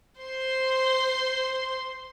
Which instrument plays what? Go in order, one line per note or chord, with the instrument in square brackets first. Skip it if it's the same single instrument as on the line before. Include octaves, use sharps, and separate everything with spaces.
[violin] C5 C6